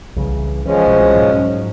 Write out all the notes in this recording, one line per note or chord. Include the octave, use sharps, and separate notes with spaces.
C2 C#3 E3
E3 F3 G#3 C#4
C2 B2
G#2 F#3